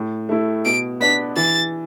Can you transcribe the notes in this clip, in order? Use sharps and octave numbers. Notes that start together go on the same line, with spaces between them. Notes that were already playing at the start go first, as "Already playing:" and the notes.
Already playing: A2
A3 E4
B2 D7
B3 D4 B6
E3 A6